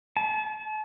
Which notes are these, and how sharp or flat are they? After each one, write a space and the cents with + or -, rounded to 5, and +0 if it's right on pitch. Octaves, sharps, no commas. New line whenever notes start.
A5 -40